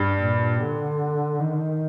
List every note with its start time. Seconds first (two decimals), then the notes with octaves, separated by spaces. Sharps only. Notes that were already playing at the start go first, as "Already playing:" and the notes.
Already playing: G2
0.19 A#2
0.60 D3
1.39 D#3